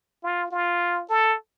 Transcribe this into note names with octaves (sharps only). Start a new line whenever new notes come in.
F4
F4
A4